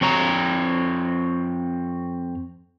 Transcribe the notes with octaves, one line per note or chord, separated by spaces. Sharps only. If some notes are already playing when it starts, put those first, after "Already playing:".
F2 C4 C#5 A#5